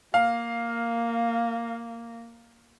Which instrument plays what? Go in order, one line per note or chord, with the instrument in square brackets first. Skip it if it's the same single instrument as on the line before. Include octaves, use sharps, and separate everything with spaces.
[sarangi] A#3 [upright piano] F5